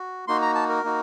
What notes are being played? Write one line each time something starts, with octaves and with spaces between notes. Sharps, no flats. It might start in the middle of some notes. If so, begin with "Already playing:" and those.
Already playing: F#4
A#3 D#4 F#4 C6
A#5
A5
A#4
A#3 D#4 F#4